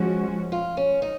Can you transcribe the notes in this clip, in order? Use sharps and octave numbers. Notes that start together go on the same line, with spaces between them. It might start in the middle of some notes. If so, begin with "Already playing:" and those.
Already playing: F3 G#3 C#4 F#4
F4
C#4
D#4